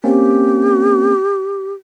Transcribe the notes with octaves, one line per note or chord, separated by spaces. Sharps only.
A#3 C4 C#4 G4